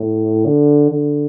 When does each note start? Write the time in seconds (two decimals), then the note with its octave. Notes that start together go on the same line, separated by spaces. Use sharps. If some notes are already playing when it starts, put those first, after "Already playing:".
Already playing: A2
0.45 D3
0.91 D3